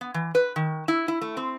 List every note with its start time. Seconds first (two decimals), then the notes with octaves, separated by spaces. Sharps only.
0.01 B3
0.14 E3
0.35 B4
0.56 D#3
0.88 E4
1.08 E4
1.21 A3
1.37 C4